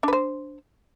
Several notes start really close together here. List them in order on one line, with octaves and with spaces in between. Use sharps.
D4 B4 C5